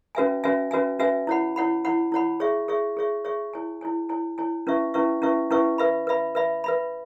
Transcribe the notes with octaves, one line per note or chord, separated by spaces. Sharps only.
C#4 F#4 B4 E5 G#5
C#4 F#4 B4 E5 G#5
C#4 F#4 B4 E5 G#5
C#4 F#4 B4 E5 G#5
E4 C#5 F#5 B5
E4 C#5 F#5 B5
E4 C#5 F#5 B5
E4 C#5 F#5 B5
G#4 C#5 E5 C#6
G#4 C#5 E5 C#6
G#4 C#5 E5 C#6
G#4 C#5 E5 C#6
E4 C#5 G#5
E4 C#5 G#5
E4 C#5 G#5
E4 C#5 G#5
C#4 E4 B4 E5 C#6
C#4 E4 B4 E5 C#6
C#4 E4 B4 E5 C#6
C#4 E4 B4 E5 C#6
B4 E5 B5
B4 E5 B5
B4 E5 B5
B4 E5 B5